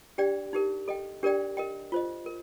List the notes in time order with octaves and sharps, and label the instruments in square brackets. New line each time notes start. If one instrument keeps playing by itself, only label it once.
[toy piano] D4 G4 D5 G5
D#4 G4 A#4
A4 D#5 G5
D4 G4 A#4 D5 G5
A#4 D#5 G5
F4 C5 D#5
A#4